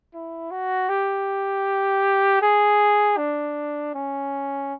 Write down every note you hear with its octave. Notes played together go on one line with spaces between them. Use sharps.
E4
F#4
G4
G#4
D4
C#4